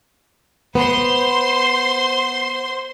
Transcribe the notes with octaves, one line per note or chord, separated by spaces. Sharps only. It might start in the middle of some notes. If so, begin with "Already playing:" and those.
B3 C5 C6